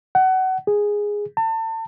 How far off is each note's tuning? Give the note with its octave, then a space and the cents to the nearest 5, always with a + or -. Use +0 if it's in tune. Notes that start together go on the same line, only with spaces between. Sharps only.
F#5 +25
G#4 -5
A5 +35